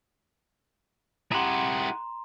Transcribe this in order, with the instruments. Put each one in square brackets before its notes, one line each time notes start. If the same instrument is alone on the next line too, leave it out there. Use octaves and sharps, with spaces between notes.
[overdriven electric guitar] E4 G4 [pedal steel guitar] G#4 F#5 [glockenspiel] A#5 C6